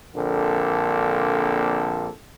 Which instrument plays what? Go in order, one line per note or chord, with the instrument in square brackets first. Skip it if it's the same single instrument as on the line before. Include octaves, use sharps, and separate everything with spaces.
[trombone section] A#1 D3 A#3 C4 A4